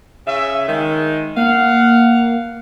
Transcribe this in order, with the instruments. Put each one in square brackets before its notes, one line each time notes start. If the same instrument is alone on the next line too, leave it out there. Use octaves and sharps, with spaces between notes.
[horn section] C#3 E5
D#3 G#3
[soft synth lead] A#3 [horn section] F5 F#5